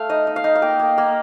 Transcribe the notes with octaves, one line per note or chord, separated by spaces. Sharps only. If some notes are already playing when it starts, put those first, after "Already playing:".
Already playing: A3 F5
D#4 D#5
D#4
F5
D#4
F5
A#3 G5
A#3
A#3